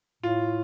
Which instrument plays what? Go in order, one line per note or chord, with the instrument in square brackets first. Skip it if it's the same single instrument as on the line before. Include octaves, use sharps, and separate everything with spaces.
[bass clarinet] A2 [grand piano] F4